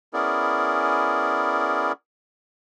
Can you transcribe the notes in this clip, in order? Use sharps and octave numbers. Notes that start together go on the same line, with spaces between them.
B3 C#4 E4 G#4 A#4 D5